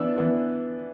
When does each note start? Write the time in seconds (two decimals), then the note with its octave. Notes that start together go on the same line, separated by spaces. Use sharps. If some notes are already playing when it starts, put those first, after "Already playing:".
Already playing: E3 B3 D4 E6
0.16 E3 B3 D4